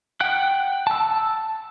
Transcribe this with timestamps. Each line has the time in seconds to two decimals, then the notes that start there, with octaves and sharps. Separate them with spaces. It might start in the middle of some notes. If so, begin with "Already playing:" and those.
0.20 F#5 G5 F#6
0.87 A5 E6